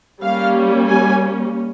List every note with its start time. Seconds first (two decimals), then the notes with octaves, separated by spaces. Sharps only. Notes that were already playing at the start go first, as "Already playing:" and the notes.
0.21 G3 A#3 C#4 F5
0.88 G#5